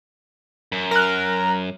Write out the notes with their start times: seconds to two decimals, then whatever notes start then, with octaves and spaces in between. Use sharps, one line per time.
0.72 F#2
0.91 A#4 A#5 F#6